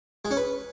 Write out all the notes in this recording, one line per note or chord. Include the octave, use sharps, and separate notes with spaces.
G#3
C#4
B4